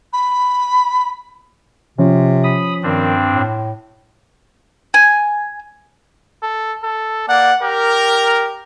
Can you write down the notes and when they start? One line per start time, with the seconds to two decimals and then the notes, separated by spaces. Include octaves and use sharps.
0.13 B5
1.98 C3 F3 C#4
2.44 B5 D#6
2.83 G2 D#3 C4 D4
3.33 A2
4.94 G#5
6.43 A4
6.83 A4
7.29 A#3 D5 F#5
7.63 G4 A#4